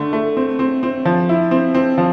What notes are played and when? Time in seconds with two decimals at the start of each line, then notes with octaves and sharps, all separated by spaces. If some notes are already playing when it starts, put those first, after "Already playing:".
Already playing: D3 A3
0.13 A3
0.37 C4
0.59 C4
0.83 C4
1.05 F3
1.29 E4
1.51 C4
1.75 C4
1.98 F3